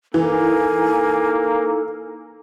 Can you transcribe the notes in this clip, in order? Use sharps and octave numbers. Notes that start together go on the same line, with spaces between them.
E3 A#3 D#4 A4 G#5